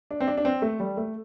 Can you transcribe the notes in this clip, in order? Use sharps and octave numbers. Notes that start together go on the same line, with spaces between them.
D4
C4
D4
D4
C4
A3
G3
A3